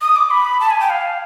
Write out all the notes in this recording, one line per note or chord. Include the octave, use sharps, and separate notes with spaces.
D#6
D6
B5
A5
G#5
G5
F5